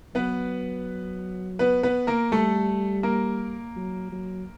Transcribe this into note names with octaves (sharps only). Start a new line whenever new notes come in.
F#3 B3 B4
B3 B4
B3 B4
A#3 A#4
G3 A3 A4
A#3 A#4
F#3
F#3